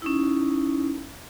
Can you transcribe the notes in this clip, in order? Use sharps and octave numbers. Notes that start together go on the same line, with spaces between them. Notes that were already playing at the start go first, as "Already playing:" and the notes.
C#4 D#4 E4